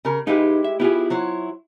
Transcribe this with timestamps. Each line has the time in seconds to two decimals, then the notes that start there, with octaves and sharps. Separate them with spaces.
0.05 C#3 A#4
0.27 G#3 D#4 E4 G4 B4 F5
0.64 E5
0.80 B3 E4 F4 G4 G#4
1.10 F#3 C5 C#5